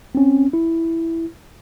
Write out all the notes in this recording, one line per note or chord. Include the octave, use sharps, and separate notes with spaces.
C4 C#4
E4